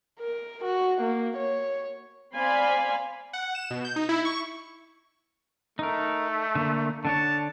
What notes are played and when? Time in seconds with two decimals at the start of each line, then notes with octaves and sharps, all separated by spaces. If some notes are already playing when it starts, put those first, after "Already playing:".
0.20 A#4
0.64 F#4
1.01 A#3
1.37 C#5
2.36 C4 D5 F5 G#5 B5 C6
3.33 F#5
3.55 E7
3.70 B2
3.85 G6
3.96 D#4
4.09 E4
4.25 C#6
5.79 A3 D#4 A#4
6.55 D3 A#3
7.05 D3 D4 C#5 A5